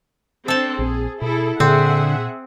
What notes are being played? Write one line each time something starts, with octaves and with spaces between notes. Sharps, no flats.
C4 D4 A4 A5
A#1 C4 G#4
B2 E4 G#4 A4
A#2 D3 C4 G#4 E5 F#5